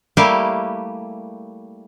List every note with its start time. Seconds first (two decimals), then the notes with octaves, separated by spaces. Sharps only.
0.17 G3 A3 A#3 E4 G4 F5